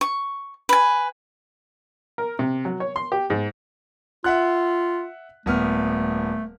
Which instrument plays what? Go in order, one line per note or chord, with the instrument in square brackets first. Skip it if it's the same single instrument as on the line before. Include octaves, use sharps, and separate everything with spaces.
[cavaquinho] C#6
B4 G#5
[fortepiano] A#4
C3
F#3
C#5
C6
G4
G#2
[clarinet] F4 [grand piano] E5 F#5 F#6
[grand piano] D#1 B3 F6 [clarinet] A3